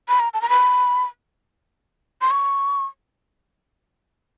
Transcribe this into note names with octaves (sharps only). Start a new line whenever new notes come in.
B5
A#5
A5
A#5
B5
C6
C#6